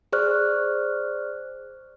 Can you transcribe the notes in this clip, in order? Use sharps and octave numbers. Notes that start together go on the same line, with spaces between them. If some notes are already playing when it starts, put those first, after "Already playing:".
G#4 C5 D5 C#6 F6 F#6